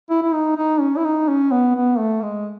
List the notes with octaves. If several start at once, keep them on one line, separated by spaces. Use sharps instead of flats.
E4
E4
D#4
D#4
C#4
E4
D#4
C#4
B3
B3
A3
G#3